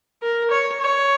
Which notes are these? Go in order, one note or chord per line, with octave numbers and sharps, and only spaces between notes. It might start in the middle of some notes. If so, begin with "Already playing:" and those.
A#4
C#5
C#5